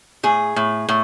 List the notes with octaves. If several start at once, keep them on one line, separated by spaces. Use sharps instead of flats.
A2 G#4
A2
A2